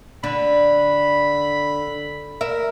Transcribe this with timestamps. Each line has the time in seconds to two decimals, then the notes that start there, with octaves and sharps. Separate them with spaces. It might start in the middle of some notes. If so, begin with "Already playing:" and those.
0.24 D3 B5
2.41 A#4 E5